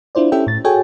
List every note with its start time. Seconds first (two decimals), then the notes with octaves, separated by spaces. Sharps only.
0.15 D4 E4 F4 C5 D5
0.32 C#4 E4 G4 A4 E5 G5
0.47 A2 A6
0.65 F#4 G#4 A4 C#5 G5 G#5